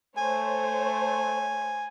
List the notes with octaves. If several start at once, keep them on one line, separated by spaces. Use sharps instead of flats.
A3 C5 C#5 G#5